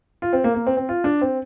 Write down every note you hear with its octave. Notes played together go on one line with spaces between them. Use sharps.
F4
C4
A#3
A#3
C4
C4
F4
D4
C4